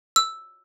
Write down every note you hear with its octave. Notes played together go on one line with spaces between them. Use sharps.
E6